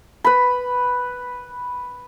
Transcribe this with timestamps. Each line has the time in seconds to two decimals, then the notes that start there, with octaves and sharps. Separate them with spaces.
0.24 B4 B5